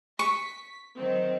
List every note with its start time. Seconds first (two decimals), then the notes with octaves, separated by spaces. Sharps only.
0.19 C#6 B6
0.95 D#3 F#3 C4